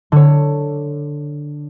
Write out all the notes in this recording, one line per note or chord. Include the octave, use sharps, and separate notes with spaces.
D3 C#5